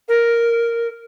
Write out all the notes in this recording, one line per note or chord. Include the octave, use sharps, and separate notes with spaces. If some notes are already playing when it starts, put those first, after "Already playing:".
A#4